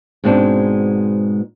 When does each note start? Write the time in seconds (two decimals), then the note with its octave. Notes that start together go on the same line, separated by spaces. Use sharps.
0.24 G#2 B2 G#3 C4 D4